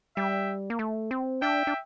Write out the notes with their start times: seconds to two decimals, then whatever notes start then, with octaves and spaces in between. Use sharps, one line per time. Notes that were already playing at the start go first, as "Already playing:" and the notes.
0.17 G3 E5 G5
0.70 A#3
0.79 A3
1.11 C4
1.42 D4 E5 G5
1.67 D4